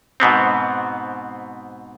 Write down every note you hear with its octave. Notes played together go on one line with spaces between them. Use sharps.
G#2 B2 B3 C4